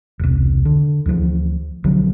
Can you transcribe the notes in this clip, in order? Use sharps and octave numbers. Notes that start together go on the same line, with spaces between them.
E1 C2
D3
D2 E3 F3
B1 D3 F3 F#3